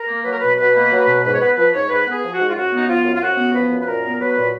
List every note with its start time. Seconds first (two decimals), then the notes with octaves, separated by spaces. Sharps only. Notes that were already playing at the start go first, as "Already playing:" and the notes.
Already playing: A#4
0.08 A#3
0.24 F#3 B4
0.33 A#4
0.39 B2 B4
0.57 B2 B4
0.75 A#3
0.91 F#3
1.07 B2
1.24 G#2 B4
1.34 C#5
1.40 B3 B4
1.56 F3 B4
1.73 G#2 C#5
1.89 G#2 B4
2.06 B3
2.12 G#4
2.23 F3
2.34 F#4
2.39 G#2
2.49 F4
2.55 F#2 F#4
2.71 B3
2.78 D#4
2.88 F3 F4
3.04 F#2
3.16 F4
3.21 F#2 F#4
3.37 B3
3.53 F3 B4
3.71 F#2
3.81 B4
3.86 A#2 A#4
4.04 B3
4.20 F#3 B4
4.36 A#2